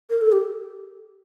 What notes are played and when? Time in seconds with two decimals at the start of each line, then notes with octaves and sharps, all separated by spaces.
0.10 A#4
0.21 A4
0.32 G4